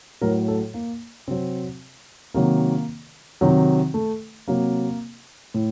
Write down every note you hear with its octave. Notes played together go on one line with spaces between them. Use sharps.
A2 F#3 A#4
A4
A#3
C3 F#3 C4
C3 D#3 F#3 A#3
C3 D#3 F#3
A3
C3 F#3 A#3
A2